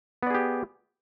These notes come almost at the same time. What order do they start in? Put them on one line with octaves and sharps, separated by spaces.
B3 D5 G#4 G4